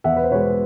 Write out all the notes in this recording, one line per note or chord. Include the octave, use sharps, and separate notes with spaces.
E2 E5 F#5
B4
C5
B2 G#3 B4 C#5